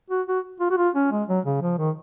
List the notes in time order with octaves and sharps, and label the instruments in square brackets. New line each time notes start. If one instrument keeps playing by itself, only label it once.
[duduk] F#4
F#4
F4
F#4
F4
C#4
G#3
F#3
C#3
F3
D#3